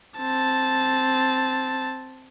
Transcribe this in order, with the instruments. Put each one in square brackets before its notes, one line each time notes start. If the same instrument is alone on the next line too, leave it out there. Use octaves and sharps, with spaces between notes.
[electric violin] C4 A5